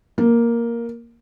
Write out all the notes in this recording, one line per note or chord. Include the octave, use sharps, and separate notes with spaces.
A#3